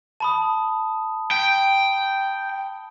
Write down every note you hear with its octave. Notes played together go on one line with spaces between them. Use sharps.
A5 B5 D#6
G5